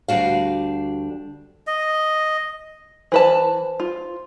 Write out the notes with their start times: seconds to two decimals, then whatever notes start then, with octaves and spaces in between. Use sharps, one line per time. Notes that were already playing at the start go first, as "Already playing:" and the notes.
0.08 D2 G3 D4 F#4 F5
1.67 D#5
3.12 E3 B4 C5 A5
3.80 F4